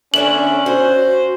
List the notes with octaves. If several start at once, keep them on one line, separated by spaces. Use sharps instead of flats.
D3 B3 C#4 D4 A#4 E5 F#7
F#4 C5